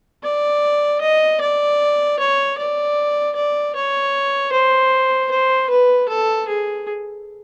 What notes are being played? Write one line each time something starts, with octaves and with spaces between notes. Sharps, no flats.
D5
D#5
D5
C#5
D5
D5
C#5
C5
C5
B4
A4
G#4